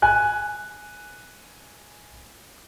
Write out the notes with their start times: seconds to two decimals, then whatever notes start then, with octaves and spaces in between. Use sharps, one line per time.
0.02 G#5 F#6